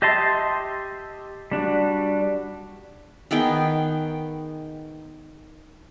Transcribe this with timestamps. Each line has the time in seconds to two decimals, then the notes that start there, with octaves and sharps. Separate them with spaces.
0.02 G4 D#5 E5 A5 C6
1.52 G3 D4 F#4
3.31 D#3 B3 G#4 G5